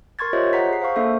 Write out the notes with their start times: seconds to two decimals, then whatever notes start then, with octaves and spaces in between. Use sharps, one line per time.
0.19 A#4 C6 C#6 G#6 A6
0.33 F4 G4 C5 C#5 D#5 E5
0.53 F#5 A#5 B6
0.69 G#4 C7
0.82 C5 F5 C#6
0.96 A#3 D4 A4 E5